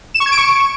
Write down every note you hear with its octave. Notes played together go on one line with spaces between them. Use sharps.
E7
C#6
G#6
D7
C#6